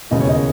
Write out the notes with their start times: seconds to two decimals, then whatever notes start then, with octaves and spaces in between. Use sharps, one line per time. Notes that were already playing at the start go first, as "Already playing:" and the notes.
0.11 E1 D#2 C#3 E3 D#5
0.20 C#5
0.29 D#5